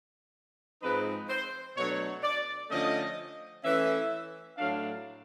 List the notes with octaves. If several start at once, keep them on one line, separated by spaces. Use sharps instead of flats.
G#2 F3 G#3 C4 D#4 B4
C5
B2 F#3 A3 D4 C#5
D5
D3 F3 A3 C#4 D#5
E3 A3 C#4 E5
A2 F#3 A3 D4 F5